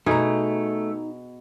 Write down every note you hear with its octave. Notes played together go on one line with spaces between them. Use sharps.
B2 A3 D#4 G#4 A#5